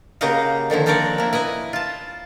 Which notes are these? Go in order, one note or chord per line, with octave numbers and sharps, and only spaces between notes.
C#3 A#3 F#4 G4 D#5 F5
D3 D#3 F3 E4
F3 C4 D4 A#4 C#5 D5
A#3 E4
E4 B4 D#5 G#5
F4 A5